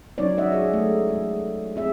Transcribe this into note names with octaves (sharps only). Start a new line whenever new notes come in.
F#3 C#4 D#4 C#5 D5
G#3 D#4 D#5 E5 F#5
G#4 C#5
G#3 A3
G#3
C4 G#4 E5